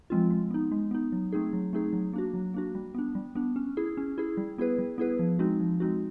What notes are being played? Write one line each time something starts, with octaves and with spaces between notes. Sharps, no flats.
F3 G#3 C4 F4
G#3
B3 D#4
G#3
B3 D#4
F#3
A3 C4 D#4 G#4
F#3
A3 C4 D#4 G#4
F#3
A#3 D4 F#4
F#3
A#3 D4 F#4
G3
B3 D4
G3
B3 D4
C#4
E4 G#4
C#4
E4 G#4
G3
B3 E4 G#4 B4
G3
B3 E4 G#4 B4
F3
G#3 C4 D#4 F#4
F3
G#3 C4 D#4 F#4